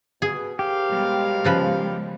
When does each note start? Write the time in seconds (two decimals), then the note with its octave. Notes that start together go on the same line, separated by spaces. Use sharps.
0.22 B2 G#4
0.59 G4 A#4 C5 F5
0.90 B2 G3 G#3
1.44 C#3 F3 B4